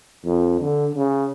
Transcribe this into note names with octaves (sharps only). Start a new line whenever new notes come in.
F2
D3
C#3